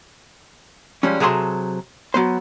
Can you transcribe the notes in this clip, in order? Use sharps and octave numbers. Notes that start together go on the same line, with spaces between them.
F3 G3 G#3 C#4
C3 F#3 G#4 A4 D5 C6
F#3 B3 C5